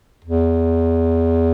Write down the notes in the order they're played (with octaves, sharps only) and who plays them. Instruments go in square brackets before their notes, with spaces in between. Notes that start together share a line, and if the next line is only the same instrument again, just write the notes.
[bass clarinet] E2